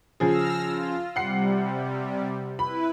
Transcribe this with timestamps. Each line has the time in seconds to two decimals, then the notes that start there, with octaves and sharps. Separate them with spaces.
0.20 C#3 F3 G#4 E6 F6 A#6
0.60 F4
1.16 C3 G3 F#5 C7
2.59 E4 B4 B5